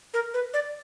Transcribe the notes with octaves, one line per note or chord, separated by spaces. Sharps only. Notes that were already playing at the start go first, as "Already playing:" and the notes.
A#4
B4
D5